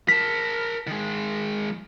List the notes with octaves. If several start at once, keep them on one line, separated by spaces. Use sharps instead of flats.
A#4 A5 B6
D#3 G#3